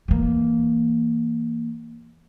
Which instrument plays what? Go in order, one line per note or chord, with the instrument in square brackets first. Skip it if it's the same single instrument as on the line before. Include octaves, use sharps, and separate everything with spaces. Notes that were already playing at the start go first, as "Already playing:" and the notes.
[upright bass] E3 A#3